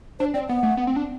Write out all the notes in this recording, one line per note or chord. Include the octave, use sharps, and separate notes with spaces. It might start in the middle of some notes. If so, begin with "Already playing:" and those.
D4 C5
C4 D5
B3 F#5
A3
B3
C4
D4